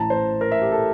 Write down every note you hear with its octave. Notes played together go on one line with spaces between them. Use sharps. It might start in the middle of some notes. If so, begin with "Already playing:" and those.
Already playing: A1 A2 E3 A5 A#5
C5
A#4
E5
G4
A4